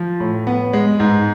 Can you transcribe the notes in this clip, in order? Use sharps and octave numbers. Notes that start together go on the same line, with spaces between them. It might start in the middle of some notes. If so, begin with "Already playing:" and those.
Already playing: F3
A2
B3
G#3
G#2